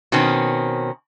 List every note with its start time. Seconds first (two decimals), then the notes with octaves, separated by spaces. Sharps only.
0.12 B2 D#3 C4 C#4